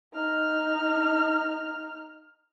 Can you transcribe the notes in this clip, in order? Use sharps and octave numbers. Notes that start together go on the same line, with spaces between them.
D#4 F6